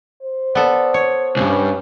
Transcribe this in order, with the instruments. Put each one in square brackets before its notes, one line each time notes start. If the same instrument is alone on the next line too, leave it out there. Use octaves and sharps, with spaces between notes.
[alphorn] C5
[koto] B3 A4 [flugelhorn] D5
[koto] C#5
[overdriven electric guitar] C2 G2 [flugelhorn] C#4